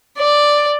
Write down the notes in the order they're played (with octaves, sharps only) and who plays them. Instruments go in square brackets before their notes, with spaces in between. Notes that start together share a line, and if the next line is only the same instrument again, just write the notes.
[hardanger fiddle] D5